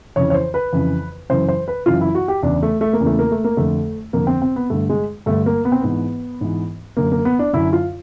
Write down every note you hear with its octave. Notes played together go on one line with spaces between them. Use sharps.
F2 C#3 E3 C#5
C#5
C5
B4
F2 C#3 E3
F#2 C#3 E3 C5
C5
B4
F#2 C#3 E3 F4
E4
F#4
G4
E2 C#3 E3 D4
A3
A3
A#3
E2 C#3 E3
A3
A#3
A3
A#3
F2 D3 A3
F2 D3 A#3
C4
C4
B3
G2 D3 A3
G#3
G2 D3 A3
A#3
B3
C4
G#2 E3 B3
G#2 E3
F#2 D3 A#3
A#3
B3
D4
F#2 D3 E4
F4